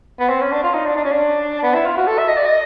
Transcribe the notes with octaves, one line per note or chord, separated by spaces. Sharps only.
B3
C4
C#4
D4
F4
D#4
D4
D4
C#4
D4
B3
E4
F4
F#4
A4
E5
D#5
D5
D#5